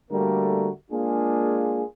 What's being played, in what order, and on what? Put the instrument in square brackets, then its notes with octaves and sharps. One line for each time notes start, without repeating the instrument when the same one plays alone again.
[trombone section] D3 G3 A3 A#3 F#4 A#4
G#3 A#3 D4 F4 G#4